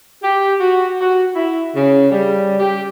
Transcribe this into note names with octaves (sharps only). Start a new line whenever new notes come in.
G4
F#4
F#4
E4
C#3
G3
G4